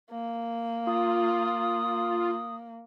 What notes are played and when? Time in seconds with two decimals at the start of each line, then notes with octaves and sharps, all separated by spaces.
0.11 A#3
0.87 F4 D#6